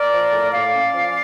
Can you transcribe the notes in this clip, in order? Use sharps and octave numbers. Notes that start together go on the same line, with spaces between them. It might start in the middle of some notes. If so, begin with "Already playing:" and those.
Already playing: A#4 D5
F3
A2
A2 D5 F5
C#4
F3